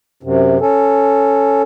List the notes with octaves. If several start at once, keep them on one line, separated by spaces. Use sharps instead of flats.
F#2 C3
C#4 A4